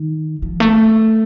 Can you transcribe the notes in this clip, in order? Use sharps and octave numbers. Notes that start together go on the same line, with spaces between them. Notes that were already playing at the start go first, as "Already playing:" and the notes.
Already playing: D#3
F3
A3